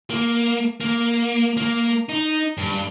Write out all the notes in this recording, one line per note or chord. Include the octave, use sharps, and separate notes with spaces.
A#3
A#3
A#3
D#4
G2